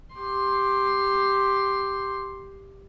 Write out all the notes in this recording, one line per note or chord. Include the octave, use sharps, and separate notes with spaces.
G4 C6